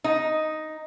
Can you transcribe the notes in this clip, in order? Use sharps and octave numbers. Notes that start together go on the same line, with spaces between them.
D#4